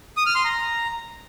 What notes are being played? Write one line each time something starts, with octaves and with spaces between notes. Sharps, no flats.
D#6
F6
C6
A#5